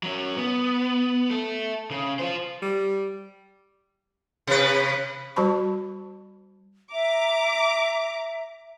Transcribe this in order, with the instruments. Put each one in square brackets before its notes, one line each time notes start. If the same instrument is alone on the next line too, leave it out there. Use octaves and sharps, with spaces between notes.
[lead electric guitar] F#3 C#4
B3
A3 A4
C#3
F4 C5
[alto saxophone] G3
[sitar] C3 B4
[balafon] G3 F#4 C5 A5 B5 C#6
[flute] E5 [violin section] A#5 D6